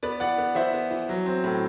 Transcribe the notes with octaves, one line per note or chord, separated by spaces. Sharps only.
B3 B4 D5
E3 D5 F#5
B3
E3 C5 E5
B3
E3
F#3
C4
A2